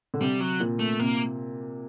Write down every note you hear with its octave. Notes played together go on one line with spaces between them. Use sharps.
D3
C3 G3
F#3
A#2
A3
C3 A#3